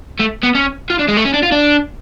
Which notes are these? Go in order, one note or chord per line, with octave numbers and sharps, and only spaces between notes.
A3
B3
C#4
F4
D4
G#3
A3
C#4
D4
F4
D4